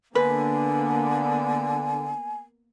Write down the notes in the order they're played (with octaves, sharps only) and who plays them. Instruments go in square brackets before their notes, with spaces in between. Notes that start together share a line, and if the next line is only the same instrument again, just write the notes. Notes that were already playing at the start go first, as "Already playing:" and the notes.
[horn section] D3 [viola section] A#3 B3 [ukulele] B4 [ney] G#5